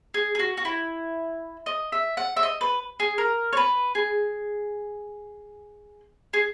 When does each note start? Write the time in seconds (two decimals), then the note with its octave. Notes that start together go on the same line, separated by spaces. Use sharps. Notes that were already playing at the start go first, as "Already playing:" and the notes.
0.14 G#4
0.35 G#4
0.39 F#4
0.57 F#4
0.65 E4
1.66 D#5
1.92 E5
2.17 F#5
2.36 E5
2.43 D#5
2.61 B4
3.00 G#4
3.18 A#4
3.53 C#5
3.57 B4
3.95 G#4
6.33 G#4